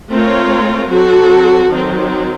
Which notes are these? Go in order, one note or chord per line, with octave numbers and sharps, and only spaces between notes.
A3 C4 F4 A#4 C#5
F#3 C4 F#4 A4
D#3 F#3 C4